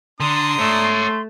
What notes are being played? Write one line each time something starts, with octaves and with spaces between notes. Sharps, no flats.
D3 D4 A#5 C6 D#6
A3 C#5 E5